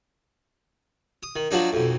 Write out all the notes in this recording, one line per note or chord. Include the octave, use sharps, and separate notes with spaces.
D#6
D#3
F3 F#3 D4 D#4
B1 F2